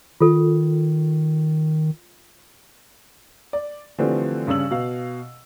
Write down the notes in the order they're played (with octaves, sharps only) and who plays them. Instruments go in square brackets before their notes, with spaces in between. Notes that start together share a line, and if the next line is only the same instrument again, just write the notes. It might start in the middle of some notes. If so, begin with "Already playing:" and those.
[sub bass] D#3 [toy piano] F4 A4
[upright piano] D5
D3 E3 F3 G3 A3 C4
G2 C#3 C#4 E6 F#7
B2 F5